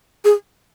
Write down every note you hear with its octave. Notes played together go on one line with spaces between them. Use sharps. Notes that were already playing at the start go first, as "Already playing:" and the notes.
G#4